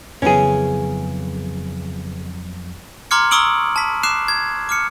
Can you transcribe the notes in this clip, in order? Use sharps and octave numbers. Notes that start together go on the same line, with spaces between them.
F2 C#3 E3 F#3 B3 C#4 G#4
A#5 C6 D6 F6 G#6 C#7
A#5 C#6 D#6 E6 D7 F#7
A5 B6
D6 F#6 C7 E7
G#6
D6 F6 C#7